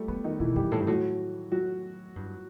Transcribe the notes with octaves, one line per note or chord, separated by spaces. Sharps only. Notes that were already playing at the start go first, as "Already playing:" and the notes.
Already playing: G3 A3 G4
F#3 B3
D#3 D#4
B2 E3 E4
F#2 G3 G4
A2 A3 A4
G2
A2 F#3 F#4
F#3 F#4
G2